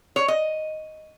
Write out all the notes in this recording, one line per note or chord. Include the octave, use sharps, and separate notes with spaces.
C#5
D#5